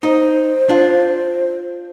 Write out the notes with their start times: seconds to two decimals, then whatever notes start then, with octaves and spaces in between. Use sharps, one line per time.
0.03 D#4 C5 D#5
0.69 D4 F4